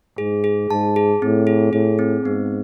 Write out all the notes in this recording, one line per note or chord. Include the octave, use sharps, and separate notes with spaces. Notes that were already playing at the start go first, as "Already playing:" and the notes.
G#2 G#4
G#4
G#2 A5
G#4
A2 C4
G#4
A2 G#4
C4
G#2 B3